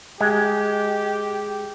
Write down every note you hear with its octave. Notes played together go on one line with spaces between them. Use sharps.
G#3 G4